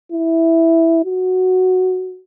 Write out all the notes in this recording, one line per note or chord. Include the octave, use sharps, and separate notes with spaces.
E4
F#4